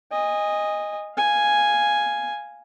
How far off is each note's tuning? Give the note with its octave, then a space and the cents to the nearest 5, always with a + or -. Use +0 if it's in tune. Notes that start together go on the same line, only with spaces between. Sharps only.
D#5 +0 G#5 -25
F5 +0 G#5 +0